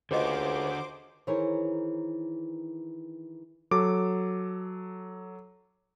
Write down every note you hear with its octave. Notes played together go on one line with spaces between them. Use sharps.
C#2 D3 F#4 G#4 C5 D#5 F5 D6
D#3 E3 G#4 A#4 C5 C#5
F#3 A4 D6